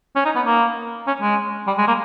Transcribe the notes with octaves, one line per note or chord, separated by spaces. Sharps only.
C#4
D#4
B3
A#3
C#4
G#3
G3
G#3
A#3